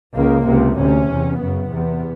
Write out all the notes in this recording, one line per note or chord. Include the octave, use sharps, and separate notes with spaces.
C#2 C#3 A#3
C#2 C3
D2 C3 C#4
E2 C3
F#2 C#3 B3
E2 C3